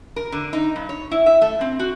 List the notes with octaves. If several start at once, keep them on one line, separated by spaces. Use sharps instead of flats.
A#4
D3
D#4
G2
C#5
E4
E5
A3
C4
F#4